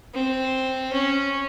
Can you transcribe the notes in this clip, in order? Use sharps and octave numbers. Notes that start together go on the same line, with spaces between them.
C4
C#4